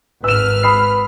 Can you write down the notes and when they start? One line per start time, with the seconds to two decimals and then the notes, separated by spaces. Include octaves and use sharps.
0.24 G#1 B4 E6 F6 E7
0.63 B5 D#6 C7